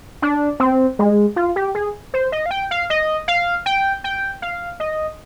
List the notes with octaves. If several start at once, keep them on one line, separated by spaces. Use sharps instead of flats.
D4
C4
G#3
F4
G4
G#4
C5
D#5
F5
G5
F5
D#5
F5
G5
G5
F5
D#5